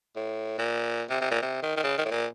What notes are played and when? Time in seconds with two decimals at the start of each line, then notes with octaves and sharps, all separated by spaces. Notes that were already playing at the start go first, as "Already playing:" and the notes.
0.16 A2
0.58 A#2
1.10 C3
1.21 C3
1.31 A#2
1.42 C3
1.62 D#3
1.76 D#3
1.83 C#3
1.98 D#3
2.05 A2
2.11 A#2